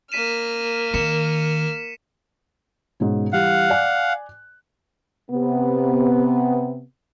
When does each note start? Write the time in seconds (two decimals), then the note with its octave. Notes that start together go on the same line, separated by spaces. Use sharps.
0.12 A#3 F6 B6 D#7 E7
0.94 D#3 B6 C#7 E7
3.00 G#2 B2 C#4
3.33 E3 G3 F5 F#5
3.70 D5 G#5 F#6
5.31 C3 B3